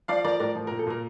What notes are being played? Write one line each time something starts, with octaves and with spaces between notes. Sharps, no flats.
F3 D5 F5
F3 A#4 D5
A2 A#4 D5
F3
A#4
A#2
A4
A#2 A#4